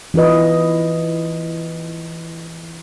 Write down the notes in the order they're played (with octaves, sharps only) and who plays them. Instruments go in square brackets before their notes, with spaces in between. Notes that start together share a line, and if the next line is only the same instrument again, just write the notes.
[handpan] E3 E4 F4 B4 D#5